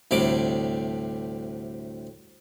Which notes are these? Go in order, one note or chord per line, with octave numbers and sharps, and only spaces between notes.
D2 A2 C3 G3 D6